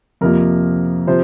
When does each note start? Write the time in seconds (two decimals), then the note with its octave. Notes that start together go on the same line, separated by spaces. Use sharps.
0.21 F2 C3 F3 A#3 A#4
1.07 C3 F3 C5